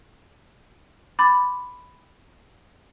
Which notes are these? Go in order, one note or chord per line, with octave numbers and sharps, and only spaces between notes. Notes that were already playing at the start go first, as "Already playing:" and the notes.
B5 C6 D6 G6 A6